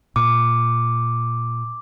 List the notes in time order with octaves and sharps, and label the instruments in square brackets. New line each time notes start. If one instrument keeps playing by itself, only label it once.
[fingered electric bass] A#2 [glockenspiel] D6